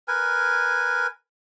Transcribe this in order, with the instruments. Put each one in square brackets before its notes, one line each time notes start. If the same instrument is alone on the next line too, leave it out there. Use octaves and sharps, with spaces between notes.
[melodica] A#4 B4 G#5